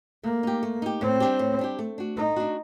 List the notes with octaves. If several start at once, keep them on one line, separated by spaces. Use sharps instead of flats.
A3 A#3
D#4 G4
A3
D#4 G4
A2 C4
G3 D4 G4
A2
G3 D4 G4
A3
D4 F#4
A3 D#4
D4 F#4